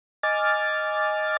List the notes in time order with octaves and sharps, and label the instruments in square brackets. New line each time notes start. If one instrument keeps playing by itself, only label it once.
[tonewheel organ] D#5 G#5 D6 F6 A6